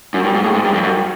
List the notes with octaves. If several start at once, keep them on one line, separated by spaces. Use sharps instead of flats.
F#2
G2
G#2
A2
G#2
G2
F2
F#2